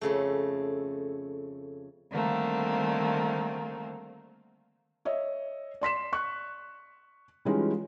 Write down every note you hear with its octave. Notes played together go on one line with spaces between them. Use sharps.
F2 C#3 A3
D3 D#3 G3 A3 A#3 C4
C#5 D#5 E5
D5 C6 B6 E7
C#6 F#6
E3 G3 G#3 C#4 D#4 F4